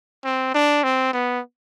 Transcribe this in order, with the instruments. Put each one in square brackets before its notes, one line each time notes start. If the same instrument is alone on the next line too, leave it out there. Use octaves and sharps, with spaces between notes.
[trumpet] C4
D4
C4
B3